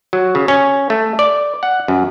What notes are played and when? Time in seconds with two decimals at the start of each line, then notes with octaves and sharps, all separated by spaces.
0.13 F#3
0.35 C#3
0.48 C#4
0.90 A3
1.19 D5
1.63 F#5
1.88 F#2